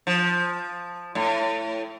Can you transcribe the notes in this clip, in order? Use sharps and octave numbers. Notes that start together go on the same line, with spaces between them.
F3
A2